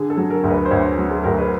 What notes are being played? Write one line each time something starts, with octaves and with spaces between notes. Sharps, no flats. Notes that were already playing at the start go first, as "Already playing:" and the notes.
Already playing: D3 G#4
A4
F#3
A#4
D2 A#4
B4
C5
D2 C#5
F#3
A4
D2 A#4
B4